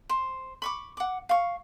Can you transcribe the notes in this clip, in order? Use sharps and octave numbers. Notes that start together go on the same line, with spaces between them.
C5
B5 C#6 D6
F#5 D6
F5 C#6